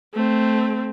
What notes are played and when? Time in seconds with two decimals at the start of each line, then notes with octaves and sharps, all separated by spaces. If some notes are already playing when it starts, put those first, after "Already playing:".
0.14 A3 C4